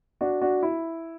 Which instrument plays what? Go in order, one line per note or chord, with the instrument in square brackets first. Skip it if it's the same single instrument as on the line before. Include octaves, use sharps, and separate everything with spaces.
[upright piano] D4 F#4
D4 F#4
E4